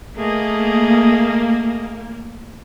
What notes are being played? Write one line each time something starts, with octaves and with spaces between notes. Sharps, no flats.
A3 A#3 G#4 D#5